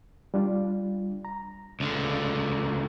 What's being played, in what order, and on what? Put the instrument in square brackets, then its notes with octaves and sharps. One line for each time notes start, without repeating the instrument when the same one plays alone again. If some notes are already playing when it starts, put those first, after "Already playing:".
[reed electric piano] G3 D4 F4
A#5
[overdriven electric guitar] C#2 D3